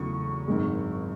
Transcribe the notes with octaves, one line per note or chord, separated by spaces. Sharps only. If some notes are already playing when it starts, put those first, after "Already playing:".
Already playing: E2 C#3 F#3 A3 C#6
G#1 F#2 D#3 G#3